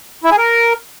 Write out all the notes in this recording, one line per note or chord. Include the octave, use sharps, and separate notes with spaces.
E4
G#4
A#4